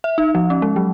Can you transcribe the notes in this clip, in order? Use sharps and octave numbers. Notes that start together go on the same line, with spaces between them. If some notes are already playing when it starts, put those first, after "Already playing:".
E5
D#4
F3
C#4
G#3
F#3